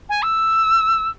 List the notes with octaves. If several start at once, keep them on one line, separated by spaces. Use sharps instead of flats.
G#5
E6